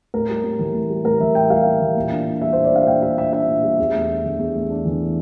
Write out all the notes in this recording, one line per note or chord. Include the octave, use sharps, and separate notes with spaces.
A2 A#4
G3
A2
E3
A2
G3
A2 A#4
E3 E5
A2 G5
G3 F5
A2
E3
A#2
D4
A#2
G3 E5
C5
A#2
D5
D4 F5
A#2 G5
G3 E5
A#2 E5
D4 E5
A#2
G3
E2
A3
D4
E3
E2
A3
D4
E3